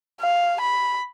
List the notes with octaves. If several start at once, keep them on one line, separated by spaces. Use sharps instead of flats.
F5
B5